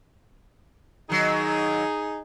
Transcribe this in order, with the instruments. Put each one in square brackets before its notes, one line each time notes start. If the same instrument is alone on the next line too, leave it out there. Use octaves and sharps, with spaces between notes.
[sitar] D#3 F#3 [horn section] D#4 G#4